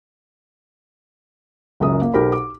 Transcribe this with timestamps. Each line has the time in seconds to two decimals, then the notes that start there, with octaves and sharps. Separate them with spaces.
1.80 F#1 C#2 F#2 G#4 D#6
2.01 A#3
2.14 B1 G4 A#4 C5 B5
2.32 D6